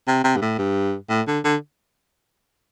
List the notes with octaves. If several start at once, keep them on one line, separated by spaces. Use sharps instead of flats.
C3
C3
G2
A2
G2
A2
D3
D3